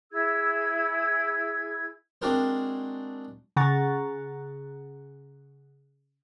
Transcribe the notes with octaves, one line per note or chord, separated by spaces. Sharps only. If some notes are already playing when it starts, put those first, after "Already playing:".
E4 G#4 E6 G#6
G#3 C4 D4 F#4 A#4 C5
C#3 G#4 F#5 A#5 C#6 A6